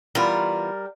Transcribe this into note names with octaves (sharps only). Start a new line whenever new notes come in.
E3 G3 B3 F4 A#4